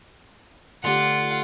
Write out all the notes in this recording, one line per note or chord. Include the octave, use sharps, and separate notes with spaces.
D3 A3 F4 G4 F#5